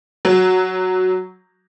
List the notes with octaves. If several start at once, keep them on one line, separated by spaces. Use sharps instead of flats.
F#3